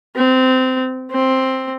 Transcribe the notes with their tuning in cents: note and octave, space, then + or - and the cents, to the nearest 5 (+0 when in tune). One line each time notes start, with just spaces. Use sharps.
C4 -20
C4 +5